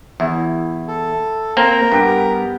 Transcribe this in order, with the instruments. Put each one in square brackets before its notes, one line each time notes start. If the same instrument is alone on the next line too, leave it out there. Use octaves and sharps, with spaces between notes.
[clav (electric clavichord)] E2 [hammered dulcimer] E4
[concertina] A4
[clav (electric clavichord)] A#3 C4 [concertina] A#4 A#5
[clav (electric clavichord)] G2 [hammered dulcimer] B3 G4